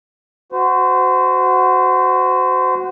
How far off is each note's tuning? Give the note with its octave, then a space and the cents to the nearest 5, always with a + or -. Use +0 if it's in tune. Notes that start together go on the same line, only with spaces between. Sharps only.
F#4 +0 C5 -30